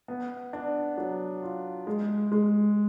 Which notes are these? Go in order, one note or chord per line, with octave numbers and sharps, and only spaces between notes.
B3
D4
F#3
F4
G#3
G#3